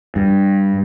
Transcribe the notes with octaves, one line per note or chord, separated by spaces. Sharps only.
G2